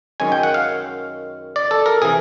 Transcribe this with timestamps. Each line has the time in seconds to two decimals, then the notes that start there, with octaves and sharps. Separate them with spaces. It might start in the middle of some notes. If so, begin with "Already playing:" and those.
0.20 F#2 D#3 G#3 C#4 G#5
0.32 G5
0.43 F#5
0.54 F5
1.56 D5
1.71 A4
1.86 A#4
2.02 C3 E3 G#4